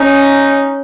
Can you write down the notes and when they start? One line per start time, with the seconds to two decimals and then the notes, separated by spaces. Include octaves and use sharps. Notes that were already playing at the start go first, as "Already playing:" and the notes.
Already playing: C#4 D#4